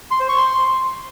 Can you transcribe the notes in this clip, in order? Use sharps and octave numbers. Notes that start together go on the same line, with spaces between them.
C6
C5
C#6
C6